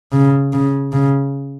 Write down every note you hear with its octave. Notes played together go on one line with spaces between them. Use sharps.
C#3
C#3
C#3